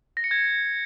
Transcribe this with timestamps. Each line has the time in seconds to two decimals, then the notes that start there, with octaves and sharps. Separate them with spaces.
0.17 A#6
0.24 C#7
0.31 G#6